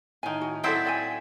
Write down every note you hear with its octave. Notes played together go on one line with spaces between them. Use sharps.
A2 D#3 G#5
F#4
F#3 C4 E4 A4 D5 D#5
D5 G5 G#5